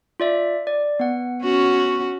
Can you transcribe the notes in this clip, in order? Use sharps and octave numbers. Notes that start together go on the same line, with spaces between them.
F4 D5 E5
D5
B3 F#5
C#4 F#4